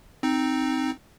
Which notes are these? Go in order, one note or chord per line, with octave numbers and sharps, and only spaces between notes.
C4 D#4